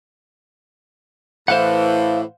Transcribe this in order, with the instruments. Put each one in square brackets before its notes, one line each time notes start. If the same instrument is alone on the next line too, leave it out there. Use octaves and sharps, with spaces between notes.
[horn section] A2 E3 [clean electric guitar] C5 F5 F#5